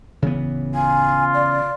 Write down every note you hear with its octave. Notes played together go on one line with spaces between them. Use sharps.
D1 C#3 E3 B3
F4 G#5
D5